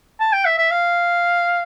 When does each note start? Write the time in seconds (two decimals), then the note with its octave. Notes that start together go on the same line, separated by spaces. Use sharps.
0.20 A5
0.33 G5
0.45 E5
0.58 E5
0.71 F5